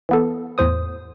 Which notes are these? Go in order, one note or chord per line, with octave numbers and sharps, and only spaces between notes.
E3 B3 A4
E2 A2 C5 D#6